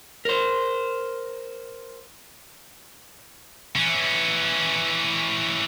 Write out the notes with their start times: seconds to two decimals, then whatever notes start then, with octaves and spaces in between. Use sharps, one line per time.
0.25 A#4 C5
3.76 E3 C#4